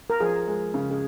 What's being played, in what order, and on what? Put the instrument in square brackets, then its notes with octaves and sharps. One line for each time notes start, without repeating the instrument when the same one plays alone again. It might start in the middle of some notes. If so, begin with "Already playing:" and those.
[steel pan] A#4
[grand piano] F3 [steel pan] G#4
[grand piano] G#3
C#3
[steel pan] G#4